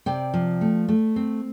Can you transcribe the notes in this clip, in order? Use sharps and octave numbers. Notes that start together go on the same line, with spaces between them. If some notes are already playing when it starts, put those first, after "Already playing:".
C3 D5 G5
F3
A3
A3
C4